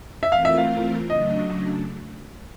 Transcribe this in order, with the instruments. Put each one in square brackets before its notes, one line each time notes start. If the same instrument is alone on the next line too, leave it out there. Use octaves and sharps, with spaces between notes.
[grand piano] E5
[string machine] E3 A3 C4 F4 A#4 [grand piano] F5
[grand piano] E5
F5
[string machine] C#3 F#3 A3 D4 [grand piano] D#5